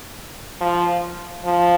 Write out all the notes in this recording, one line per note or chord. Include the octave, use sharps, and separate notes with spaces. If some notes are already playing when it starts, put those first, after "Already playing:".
F3
F3